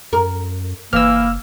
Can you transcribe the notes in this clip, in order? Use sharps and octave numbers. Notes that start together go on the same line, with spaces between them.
F#2 A#4
F#1 E3 A#3 E6 F6